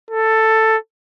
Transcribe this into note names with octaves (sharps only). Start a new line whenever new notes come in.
A4